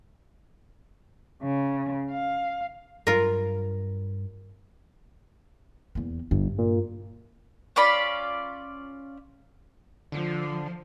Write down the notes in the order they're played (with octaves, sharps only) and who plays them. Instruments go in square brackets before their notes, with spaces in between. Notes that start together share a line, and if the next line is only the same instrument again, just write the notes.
[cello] C#3
F5
[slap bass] G2 F#3 [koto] F4 A#4
[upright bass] E2 A#3
[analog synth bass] G1 [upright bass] G2
[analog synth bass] A#2
[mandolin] C#4 F4 D5 B5
[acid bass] D3 [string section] F3